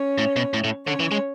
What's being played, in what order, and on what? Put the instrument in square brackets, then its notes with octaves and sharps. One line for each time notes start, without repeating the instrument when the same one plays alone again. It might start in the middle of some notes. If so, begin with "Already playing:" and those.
Already playing: [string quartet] C#4 C#5
[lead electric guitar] A2
B2
A2
A2
[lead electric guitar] D3 [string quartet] C#4 C#5
[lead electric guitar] E3
G#3